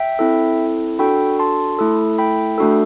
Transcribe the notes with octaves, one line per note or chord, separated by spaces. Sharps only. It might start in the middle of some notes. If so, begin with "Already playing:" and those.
Already playing: E5 G5
C4 E4 A4
D4 F#4 A4 G5 B5
A5 C6
A3 E4 A4
G5 B5
A3 D4 F#4 A4